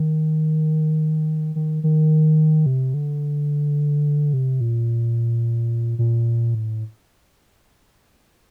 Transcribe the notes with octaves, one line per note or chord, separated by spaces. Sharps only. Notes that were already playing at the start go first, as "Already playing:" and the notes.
Already playing: D#3
D#3
D#3
C3
D3
C3
A#2
A#2
A2